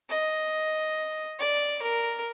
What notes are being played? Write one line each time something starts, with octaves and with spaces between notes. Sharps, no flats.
D#5
D5
A#4